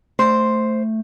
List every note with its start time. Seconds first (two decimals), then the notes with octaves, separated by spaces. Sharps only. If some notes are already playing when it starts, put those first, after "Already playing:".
0.19 A3 C5